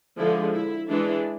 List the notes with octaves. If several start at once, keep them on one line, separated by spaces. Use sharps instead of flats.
D3 F3 G#3 E4
E4
E3 G#3 D4